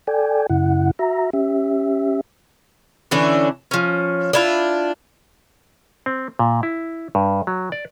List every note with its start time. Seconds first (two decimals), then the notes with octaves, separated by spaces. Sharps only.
0.07 A4 D5 G5 G#5
0.49 F#2 C#3 E4 F#5
0.99 F#4 E5 A#5
1.33 C#4 G4 E5
3.11 D3 E3 C#4 D4
3.71 F3 C#4
4.33 D4 E4 F4
6.06 C4
6.39 A#2
6.63 E4
7.15 G2
7.47 F#3
7.72 D5